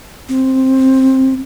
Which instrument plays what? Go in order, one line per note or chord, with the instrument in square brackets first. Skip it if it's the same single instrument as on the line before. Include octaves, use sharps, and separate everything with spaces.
[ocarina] C4